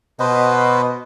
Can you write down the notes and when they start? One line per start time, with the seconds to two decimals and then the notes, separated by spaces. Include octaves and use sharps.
0.20 B2 B4 C5 D#5